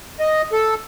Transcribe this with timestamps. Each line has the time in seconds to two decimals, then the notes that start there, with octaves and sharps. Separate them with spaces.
0.19 D#5
0.52 A4